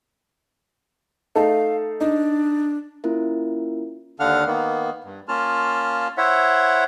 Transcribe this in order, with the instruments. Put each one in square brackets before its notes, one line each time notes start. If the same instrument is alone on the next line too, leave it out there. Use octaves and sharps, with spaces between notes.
[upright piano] A3 D#4 A4 [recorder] F5
[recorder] D4 [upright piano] D#4
[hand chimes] A#3 C#4 E4 F4 A#4
[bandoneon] D#2 D3 D4 F5 F#5 F6
D#3 A#3 B3
G2
A#3 C#4 F4 A5 F6
E4 C5 C#5 E5 F#5